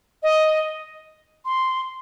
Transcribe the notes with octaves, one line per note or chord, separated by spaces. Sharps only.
D#5
C6